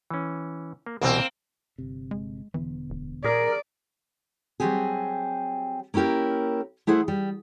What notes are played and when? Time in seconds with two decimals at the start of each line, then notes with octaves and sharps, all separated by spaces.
0.10 E3 C#4
0.86 A#3
1.02 C2 B2 E3 A#3 C4
1.78 G1 C3
2.11 G#3
2.54 E1 D3 E3 B3
2.90 D1
3.24 A#2 G#4 A#4 D5
4.60 F#3 G3 B3 C4 G4 G#4
5.94 A#3 C#4 E4 G4 A#4
6.87 A3 E4 G#4 C5 F#5
7.08 G3